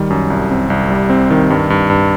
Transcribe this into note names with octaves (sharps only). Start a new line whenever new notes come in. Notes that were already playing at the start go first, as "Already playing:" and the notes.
Already playing: D#3 G3
F#2
C2
C4
C2
G3
C4
D#3
G2
G2
G2